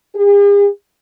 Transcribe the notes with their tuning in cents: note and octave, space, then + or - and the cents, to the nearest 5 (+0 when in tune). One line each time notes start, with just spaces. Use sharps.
G#4 -45